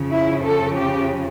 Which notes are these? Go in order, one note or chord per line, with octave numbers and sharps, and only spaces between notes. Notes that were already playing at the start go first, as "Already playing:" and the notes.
Already playing: F2 C#3 F3
E4
A4
G4